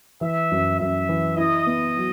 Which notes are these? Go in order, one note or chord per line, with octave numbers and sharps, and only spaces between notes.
E3 E5
F#2
F#2 E5
E3
E4 D#5
B3
F#3